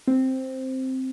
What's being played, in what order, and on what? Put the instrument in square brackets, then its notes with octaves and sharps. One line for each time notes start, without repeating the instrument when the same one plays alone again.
[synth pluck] C4